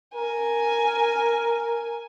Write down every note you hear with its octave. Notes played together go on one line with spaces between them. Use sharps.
A#4 G#5